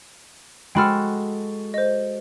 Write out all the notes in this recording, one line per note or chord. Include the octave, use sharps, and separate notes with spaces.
G#3 F#4 A4 G5 B5 F6
C5 D#5